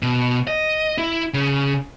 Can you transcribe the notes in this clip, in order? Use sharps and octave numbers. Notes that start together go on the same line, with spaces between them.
B2
D#5
E4
C#3